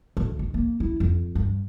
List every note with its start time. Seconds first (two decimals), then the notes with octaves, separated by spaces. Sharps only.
0.17 D2
0.39 G#1
0.54 A#3
0.80 E4
1.00 F2
1.35 G2